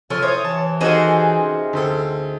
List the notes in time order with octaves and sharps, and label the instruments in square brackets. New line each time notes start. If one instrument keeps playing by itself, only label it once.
[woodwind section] C#3 [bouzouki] F3 [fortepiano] A4 C#5 F6
[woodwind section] E4 D#6 [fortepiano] C5 [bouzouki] C#5
[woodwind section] C3 E3 [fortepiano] A5
[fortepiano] D#3 F#4 A4 [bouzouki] D#4 G#4 C5
[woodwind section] C3 C#4
[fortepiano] D2 C4 A4